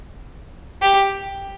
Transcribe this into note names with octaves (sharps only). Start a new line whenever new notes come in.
G4